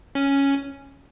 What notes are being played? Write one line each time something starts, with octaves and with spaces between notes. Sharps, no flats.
C#4